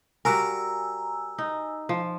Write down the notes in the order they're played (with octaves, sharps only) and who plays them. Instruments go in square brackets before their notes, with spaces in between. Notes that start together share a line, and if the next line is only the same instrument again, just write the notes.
[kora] G3 F#4 A#4 [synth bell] G#5 A#5 E6
[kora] D#4
F3